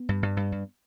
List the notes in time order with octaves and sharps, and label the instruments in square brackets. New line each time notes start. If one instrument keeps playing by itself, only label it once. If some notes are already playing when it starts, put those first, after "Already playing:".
Already playing: [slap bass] B3
G2
G2
G2
G2